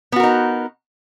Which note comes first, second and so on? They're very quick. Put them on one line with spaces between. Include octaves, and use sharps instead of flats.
B3 F#4 A#4 D#4